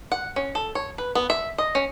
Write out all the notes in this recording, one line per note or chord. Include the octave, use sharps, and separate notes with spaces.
F#5
C#4
A4
C#5
B4
B3
E5
D#5
C#4